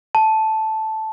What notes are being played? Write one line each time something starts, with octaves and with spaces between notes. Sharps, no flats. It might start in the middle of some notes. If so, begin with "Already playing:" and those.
A5